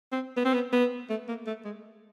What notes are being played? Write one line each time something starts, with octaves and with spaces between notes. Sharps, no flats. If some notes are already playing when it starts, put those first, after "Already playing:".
C4
B3
C4
B3
B3
A3
A#3
A3
G#3